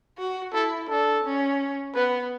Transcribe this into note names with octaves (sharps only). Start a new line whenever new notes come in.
F#4
E4 A4
D4 A4
C#4
B3 B4